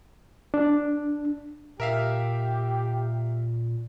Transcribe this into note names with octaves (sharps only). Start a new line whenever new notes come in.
D4
A#2 G4 A#4 E5 F5